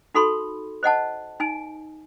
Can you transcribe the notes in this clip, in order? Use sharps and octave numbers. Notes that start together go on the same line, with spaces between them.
D#4 F#4 A4 B5 C6
C5 D#5 F#5 A5
D#4 G#5